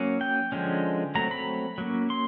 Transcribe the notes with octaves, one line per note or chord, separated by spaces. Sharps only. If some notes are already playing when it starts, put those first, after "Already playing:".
Already playing: F#3 A#3 C#4
G5
D3 F3 G#3 C#4
F#3 A3 C4 A#5
B5
F#3 A#3 C#4
C6